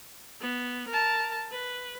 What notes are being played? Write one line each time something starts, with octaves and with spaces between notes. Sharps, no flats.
B3
A#4 A5
B4